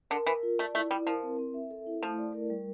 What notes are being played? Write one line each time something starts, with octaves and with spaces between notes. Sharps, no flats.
D3 A#4
E3 A#4
F4
A3 D5
A3 E4
G3 E4
F3 A#4
C4
C4
E5
A4
E4
F3 A3
D5
A#4
G3